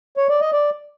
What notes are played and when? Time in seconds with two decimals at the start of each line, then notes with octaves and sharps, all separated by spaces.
0.17 C#5
0.29 D5
0.41 D#5
0.52 D5